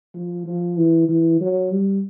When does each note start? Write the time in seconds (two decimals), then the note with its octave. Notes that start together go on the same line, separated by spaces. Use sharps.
0.15 F3
0.46 F3
0.77 E3
1.09 E3
1.41 F#3
1.71 G3